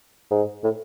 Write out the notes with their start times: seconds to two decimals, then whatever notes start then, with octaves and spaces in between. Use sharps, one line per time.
0.31 G#2
0.64 A2